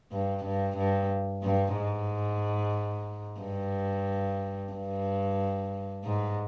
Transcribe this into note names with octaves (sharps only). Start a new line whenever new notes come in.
G2
G2
G2
G2
G#2
G2
G2
G#2